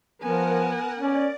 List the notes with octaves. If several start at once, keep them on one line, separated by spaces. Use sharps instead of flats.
F3 B3 A#4 F#5 G#5
C#4 D5